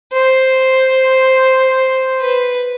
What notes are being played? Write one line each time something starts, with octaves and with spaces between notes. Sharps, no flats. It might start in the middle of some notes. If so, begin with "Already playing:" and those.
C5
B4